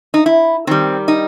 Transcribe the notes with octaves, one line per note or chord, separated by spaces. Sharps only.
D#4
E4
D#3 G3 C4
D#4